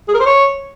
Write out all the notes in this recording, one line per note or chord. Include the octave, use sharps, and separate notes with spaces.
G#4
A#4
C5
C#5